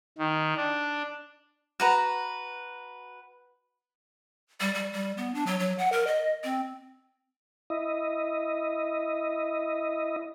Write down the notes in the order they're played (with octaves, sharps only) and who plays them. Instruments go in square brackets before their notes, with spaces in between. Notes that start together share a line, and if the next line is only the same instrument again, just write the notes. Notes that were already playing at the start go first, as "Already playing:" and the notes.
[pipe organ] D#3
D4
[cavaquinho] F#4 B4 A#5
[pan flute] G3
G3
G3
B3
D4
F#3
F#3
F#5
A#4
D#5
C4
[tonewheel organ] E4 D#5